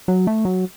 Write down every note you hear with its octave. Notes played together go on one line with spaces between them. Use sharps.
F#3
A3
F#3